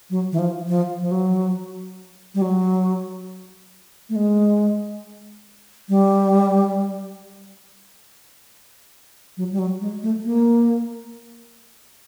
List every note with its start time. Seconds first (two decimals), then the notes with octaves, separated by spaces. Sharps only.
0.10 F#3
0.32 E3
0.39 F3
0.68 F3
1.00 F3
1.11 F#3
2.35 G3
2.42 F#3
4.09 A3
4.16 G#3
5.89 G3
9.37 F#3
9.52 G3
9.59 F#3
9.81 G#3
10.03 A3
10.24 A#3